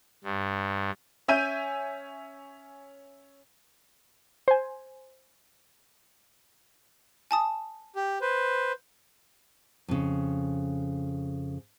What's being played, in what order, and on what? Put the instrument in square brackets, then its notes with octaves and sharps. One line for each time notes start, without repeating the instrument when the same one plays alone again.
[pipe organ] G2
[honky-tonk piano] C#4 E5 G#5 G6 D#7
[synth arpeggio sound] C5 G#5
[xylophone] G#5 A5 D#6
[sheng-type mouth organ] G4
B4 C5
[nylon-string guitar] F2 C#3